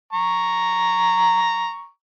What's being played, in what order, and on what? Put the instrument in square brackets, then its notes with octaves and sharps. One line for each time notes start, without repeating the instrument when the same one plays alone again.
[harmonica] A#5 C#6